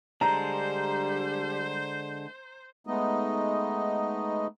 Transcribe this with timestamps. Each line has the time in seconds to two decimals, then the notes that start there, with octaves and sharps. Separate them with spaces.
0.21 D3 G3 G#3 D4 C5 A#5
2.87 G#3 A3 B3 D#4 D#5